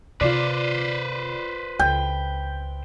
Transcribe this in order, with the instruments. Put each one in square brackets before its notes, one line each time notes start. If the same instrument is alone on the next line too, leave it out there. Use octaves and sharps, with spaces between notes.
[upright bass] C3 D#3 [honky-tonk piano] F4 D5 [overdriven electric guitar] B4 C5
[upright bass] C#2 [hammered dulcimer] G5